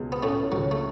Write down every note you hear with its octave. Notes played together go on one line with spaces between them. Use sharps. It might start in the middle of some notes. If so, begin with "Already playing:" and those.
Already playing: C#2 B2 G#3
B3
A2 A3 C#4
C#2 F#3
A3